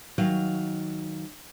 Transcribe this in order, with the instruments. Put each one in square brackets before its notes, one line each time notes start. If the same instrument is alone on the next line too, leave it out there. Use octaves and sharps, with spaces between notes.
[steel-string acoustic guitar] D#3 F#3 F5